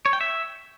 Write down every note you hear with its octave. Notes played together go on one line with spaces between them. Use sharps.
C#5
G5
E5